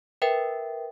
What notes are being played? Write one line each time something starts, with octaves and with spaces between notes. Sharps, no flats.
A#4 B4 E5 G5